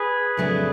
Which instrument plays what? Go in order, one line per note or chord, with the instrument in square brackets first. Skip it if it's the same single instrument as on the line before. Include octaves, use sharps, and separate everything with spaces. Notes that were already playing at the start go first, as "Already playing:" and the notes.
Already playing: [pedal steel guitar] G#4 B4
[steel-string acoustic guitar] F2 C#3 F#3 A3 D4